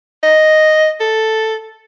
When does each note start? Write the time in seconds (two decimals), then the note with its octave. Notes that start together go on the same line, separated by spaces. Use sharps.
0.23 D#5
1.00 A4